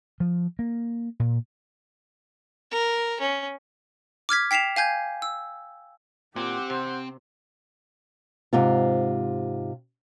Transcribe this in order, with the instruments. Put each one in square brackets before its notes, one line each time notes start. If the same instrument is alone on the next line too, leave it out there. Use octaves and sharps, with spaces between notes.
[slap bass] F3
A#3
A#2
[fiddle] A#4
C#4
[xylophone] D6 F6 G#6 B6
G5 B6 C7 E7 F7
F5 G#5 G6 G#6
E6
[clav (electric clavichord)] A#2 [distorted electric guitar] C4 [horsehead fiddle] G4 F#5 [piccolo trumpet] D6
[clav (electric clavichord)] C3 [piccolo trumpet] C5
[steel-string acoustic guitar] G#2 C3 F4